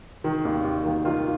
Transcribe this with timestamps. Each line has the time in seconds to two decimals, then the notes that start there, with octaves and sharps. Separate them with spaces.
0.24 D#3
0.45 D#2
0.64 D#2
0.84 D#3
1.04 D#3 F4